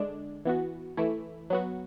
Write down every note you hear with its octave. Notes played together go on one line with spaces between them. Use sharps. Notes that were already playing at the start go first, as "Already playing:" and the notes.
Already playing: D3 G#3 D4
E3 B3 F#4
E3 A3 E4
F#3 B3 F#4